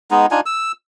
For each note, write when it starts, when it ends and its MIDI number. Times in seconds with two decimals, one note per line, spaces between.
0.11 0.26 56
0.11 0.26 59
0.11 0.26 63
0.31 0.40 62
0.31 0.40 63
0.31 0.40 65
0.31 0.40 80
0.46 0.72 88